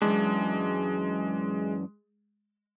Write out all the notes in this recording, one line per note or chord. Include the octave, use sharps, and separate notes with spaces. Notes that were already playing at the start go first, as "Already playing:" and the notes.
F#2 E3 G#3 D4